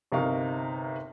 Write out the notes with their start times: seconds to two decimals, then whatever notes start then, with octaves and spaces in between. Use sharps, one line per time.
0.12 G1 C3 D#4 A#4 F5 C#6